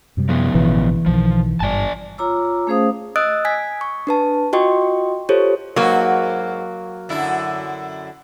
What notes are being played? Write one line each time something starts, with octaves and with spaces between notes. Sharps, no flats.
F#2 C3 G3
F3 B3
A1 B2 D3 E3
B1 B2 D#3 F3
G#1 G2 D5 G#5 A5
F4 C#5 A#5 D6 E6
A3 C#4 G#4 C5 F5 D#6
D#5 D#6 E6 F#6 A6 D7
G#5 G#6 B6
C#6
D4 B4 A5
F4 F#4 D#5 G5 C6 C#6
F4 G4 A4 C5 C#5
G#2 F#3 A#3 F#4 B4
F#2 D3 E4